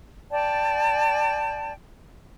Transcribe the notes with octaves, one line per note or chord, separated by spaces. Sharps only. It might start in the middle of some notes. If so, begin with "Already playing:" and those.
D5 G5 A5